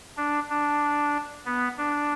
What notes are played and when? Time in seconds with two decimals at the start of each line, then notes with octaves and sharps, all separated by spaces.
0.17 D4
0.49 D4
1.46 B3
1.77 D4